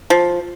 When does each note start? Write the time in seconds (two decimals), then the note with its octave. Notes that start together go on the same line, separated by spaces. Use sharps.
0.10 F3